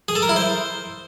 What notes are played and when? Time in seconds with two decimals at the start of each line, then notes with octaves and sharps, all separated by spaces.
0.08 G#4
0.15 A4
0.22 A#4
0.29 E4
0.36 C5